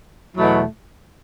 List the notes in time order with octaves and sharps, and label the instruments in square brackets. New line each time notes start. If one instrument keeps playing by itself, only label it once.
[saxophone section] E2 B2 F#3 A3 E4